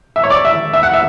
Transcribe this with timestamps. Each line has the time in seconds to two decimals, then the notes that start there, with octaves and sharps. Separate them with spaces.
0.16 E5
0.23 C#5
0.30 D5
0.45 E5
0.73 E5
0.83 F#5
0.93 E5